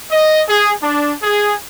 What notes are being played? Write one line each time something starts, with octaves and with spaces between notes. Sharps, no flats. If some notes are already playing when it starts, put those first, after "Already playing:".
D#5
G#4
D4
G#4